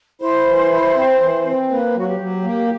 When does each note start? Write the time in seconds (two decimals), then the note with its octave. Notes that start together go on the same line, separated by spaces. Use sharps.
0.21 E4 C5
0.46 E3
0.71 E4
0.96 C4
1.21 E3
1.46 C4
1.70 A#3 B4
1.95 F#3 F#4
2.08 G4
2.20 F#3
2.44 A#3